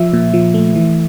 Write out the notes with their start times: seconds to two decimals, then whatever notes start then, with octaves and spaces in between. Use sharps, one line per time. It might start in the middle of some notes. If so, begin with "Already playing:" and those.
Already playing: F3 E5
0.13 A#2
0.33 F3
0.54 A3
0.75 E3